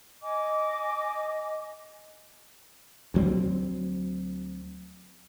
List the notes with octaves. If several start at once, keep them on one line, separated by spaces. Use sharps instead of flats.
D#5 G#5 D6
D2 F#3 C4